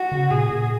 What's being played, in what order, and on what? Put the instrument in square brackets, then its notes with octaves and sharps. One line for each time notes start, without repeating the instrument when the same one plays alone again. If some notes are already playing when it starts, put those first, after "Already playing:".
Already playing: [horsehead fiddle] F#4
[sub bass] C#3
[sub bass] A#2 [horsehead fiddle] G#4
[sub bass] A#2